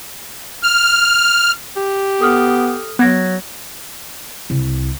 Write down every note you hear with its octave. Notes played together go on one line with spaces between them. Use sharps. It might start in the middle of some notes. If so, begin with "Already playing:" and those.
F6
G4
B3 A4 D#6 F6
F#3 B3 F#6 G#6 A#6
C2